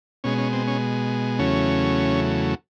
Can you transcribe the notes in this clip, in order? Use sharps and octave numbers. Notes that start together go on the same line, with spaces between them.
B2 G#3 C#4
C#4
C4
C#4
E2 C#3 F#3 A3 C#4